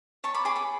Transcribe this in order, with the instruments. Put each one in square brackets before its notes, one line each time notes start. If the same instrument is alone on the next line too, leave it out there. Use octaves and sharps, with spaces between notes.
[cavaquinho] C#5 A5 C#6
B5 D6
G#4 B5 D6
B5 D6